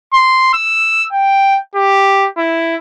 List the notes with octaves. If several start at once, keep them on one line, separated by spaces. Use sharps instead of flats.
C6
E6
G5
G4
E4